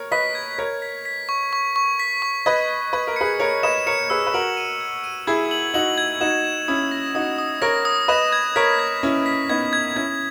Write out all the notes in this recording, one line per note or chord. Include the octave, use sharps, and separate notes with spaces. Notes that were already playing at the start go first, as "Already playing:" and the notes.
Already playing: A#4 C#5
B4 D#5 B6
G#6
A#4 C#5 B6
B6
B6
C#6
C#6
C#6
B6
C#6
B4 D#5 G#6
G#6
B4 G#6
A#4
G#4 B4 C#7
A#4 C#5 C#7
B4 D#5 E7
A#4 C#5 C#7
G#4 B4 E6
B4
F#4 A#4 F#7
D#7
G#6
D#7
E4 G#4 G#6
F#7
D#4 F#4 F#7
G#6
D#4 F#4 E7
E7
C#4 E4 D#6
A#6
D#4 F#4 D#6
D#6
A#4 C#5 A#6
D#6
B4 D#5 E7
G#6
A#4 C#5 B6
G#6
C#4 E4 B6
B6
B3 D#4 G#6
G#6
C#4 E4 G#6